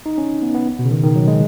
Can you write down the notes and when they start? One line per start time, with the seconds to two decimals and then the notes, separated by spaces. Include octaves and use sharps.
0.06 D#4
0.18 C#4
0.42 B3
0.55 B3
0.79 B2
0.85 C#3
0.91 D#3
1.03 D#3
1.16 F#3
1.28 G#3